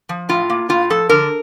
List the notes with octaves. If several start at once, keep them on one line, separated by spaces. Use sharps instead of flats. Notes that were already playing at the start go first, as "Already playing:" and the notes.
F3
A2 F4
A#3
A2 F4
F3 A4
D3 A#4